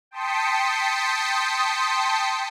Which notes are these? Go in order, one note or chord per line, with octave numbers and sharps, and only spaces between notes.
G5 A5 C6 D#6 B6 C#7